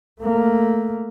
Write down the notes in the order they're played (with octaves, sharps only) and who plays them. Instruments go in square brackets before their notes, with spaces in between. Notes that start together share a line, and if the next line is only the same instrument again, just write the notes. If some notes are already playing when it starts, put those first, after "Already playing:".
[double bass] A3 A#3